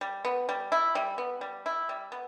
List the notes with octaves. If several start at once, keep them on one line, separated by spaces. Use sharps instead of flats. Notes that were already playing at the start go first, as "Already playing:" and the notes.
G3
B3
G3
E4
G3
B3
G3
E4
G3
B3